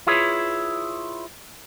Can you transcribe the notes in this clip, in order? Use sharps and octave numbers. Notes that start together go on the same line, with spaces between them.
E4 F4 G#4 B4 C#5